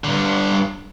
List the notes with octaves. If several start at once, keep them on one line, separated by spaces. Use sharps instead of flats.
G2 D3